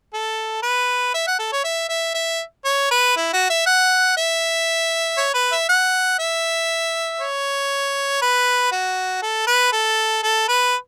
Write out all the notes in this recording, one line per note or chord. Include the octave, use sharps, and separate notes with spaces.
A4
B4
E5
F#5
A4
C#5
E5
E5
E5
C#5
B4
E4
F#4
E5
F#5
E5
C#5
B4
E5
F#5
E5
C#5
B4
F#4
A4
B4
A4
A4
B4